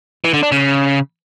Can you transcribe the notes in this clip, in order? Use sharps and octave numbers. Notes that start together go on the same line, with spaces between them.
E3
D3
D4
C#3